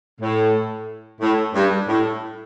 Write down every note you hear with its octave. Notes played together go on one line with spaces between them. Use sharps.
A2
A2
G2
A2